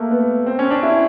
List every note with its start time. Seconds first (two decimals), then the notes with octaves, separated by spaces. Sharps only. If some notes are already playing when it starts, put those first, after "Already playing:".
Already playing: A3 A#3
0.11 B3
0.46 C4
0.59 C#4
0.71 D4
0.83 E4